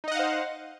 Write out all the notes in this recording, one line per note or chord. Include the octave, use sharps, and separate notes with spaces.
D#4 C5 D#5 F5 F#5